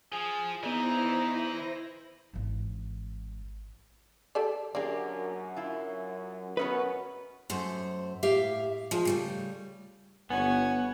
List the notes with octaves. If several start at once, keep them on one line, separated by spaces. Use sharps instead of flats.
F3 G#4
E3 B3 D#4 E4 G#4 C5 D5 A#6
G#1 E3
G4 A4 D5
F#2 A#3 D4 G4 G#4 D5
E4 F4
F#2 B3 C#4 F#4 B4 D#5
F#2 A3 C5
A2 G4 E5 F5
F3 G#3
C#3 G3 A3
G1 B3 C#5 F#5 G#5